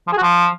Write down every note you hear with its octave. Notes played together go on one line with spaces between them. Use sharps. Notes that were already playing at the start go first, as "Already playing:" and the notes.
F3
G#4
F#4
F3